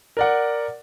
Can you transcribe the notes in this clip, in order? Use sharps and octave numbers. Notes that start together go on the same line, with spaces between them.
A#4 D5 F#5